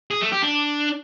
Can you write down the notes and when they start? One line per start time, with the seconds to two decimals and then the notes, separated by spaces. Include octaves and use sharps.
0.11 G#4
0.21 A3
0.32 G4
0.42 D4